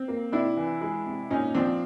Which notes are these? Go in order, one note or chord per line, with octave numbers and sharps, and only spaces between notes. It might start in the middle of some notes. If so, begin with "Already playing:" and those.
Already playing: C4
A#3
C3 D4 E4
E3
G#3
C3
A#2 C#4 D#4
F3 C4 D4